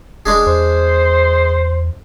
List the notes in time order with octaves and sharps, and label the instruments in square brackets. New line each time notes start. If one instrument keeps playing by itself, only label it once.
[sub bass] D#1 [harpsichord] G#3 D4 G#4
[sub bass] E2 [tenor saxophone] C5